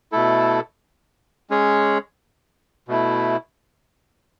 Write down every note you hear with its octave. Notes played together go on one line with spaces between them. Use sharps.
B2 A3 E4 A4
G#3 C#4 G#4 C#5
B2 A3 E4